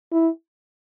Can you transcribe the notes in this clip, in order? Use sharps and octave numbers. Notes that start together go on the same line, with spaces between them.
E4